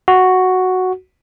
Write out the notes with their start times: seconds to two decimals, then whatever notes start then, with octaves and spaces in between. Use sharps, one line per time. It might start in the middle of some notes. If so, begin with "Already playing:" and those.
0.08 F#4